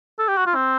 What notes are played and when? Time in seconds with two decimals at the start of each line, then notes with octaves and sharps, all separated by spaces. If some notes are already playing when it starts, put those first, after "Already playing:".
0.19 A4
0.28 G4
0.37 F#4
0.46 F4
0.55 C4